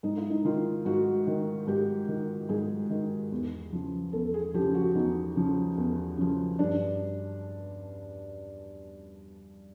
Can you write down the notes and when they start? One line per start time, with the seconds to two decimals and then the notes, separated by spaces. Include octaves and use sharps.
0.03 G#2 D#4
0.17 E4
0.30 D#4
0.45 D#3 F4
0.85 G#2 F#4
1.27 D#3
1.67 G#2 G4
2.08 D#3
2.49 G#2 G#4
2.90 D#3
3.32 E2
3.73 C#3 F3
4.13 E2 A4
4.34 G#4
4.54 C#3 F3 G4
4.75 F#4
4.95 E2 D#4
5.35 C#3 F3
5.78 E2
6.17 C#3 F3
6.59 G2 D4